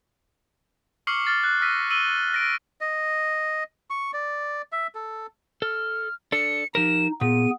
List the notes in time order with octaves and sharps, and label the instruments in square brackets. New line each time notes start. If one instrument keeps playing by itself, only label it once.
[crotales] C#6 D6 F6 C7 C#7 F#7
F6 A6 C7
F#6
E6 F6 A#6 B6 D#7
E6 D#7 F#7 G7
A#6 D7
[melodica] D#5
C#6
D5
E5
A4
[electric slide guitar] A4 [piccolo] F6
[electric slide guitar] D4 A4 [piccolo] C#7
[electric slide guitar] F3 G4 A#4 [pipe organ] D#4 [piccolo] E7
[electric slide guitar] A#2 [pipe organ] B3 G#4 [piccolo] D#7